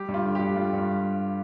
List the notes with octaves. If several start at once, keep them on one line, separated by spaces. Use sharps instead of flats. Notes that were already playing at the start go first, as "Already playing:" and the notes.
Already playing: G3 G4
G2
F4
D3
G4
G2
G3 F4
G2 F4